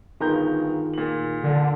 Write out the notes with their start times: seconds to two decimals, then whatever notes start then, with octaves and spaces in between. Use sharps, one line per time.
0.20 G1 D#3 F4 G#4 A#5 G6
0.94 A#2 F#7
1.43 D3